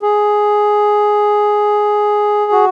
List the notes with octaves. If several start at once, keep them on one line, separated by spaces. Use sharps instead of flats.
G#4
F#4